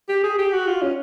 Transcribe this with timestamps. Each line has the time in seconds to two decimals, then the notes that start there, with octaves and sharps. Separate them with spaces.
0.09 G4
0.23 G#4
0.38 G4
0.53 F#4
0.67 F4
0.82 C#4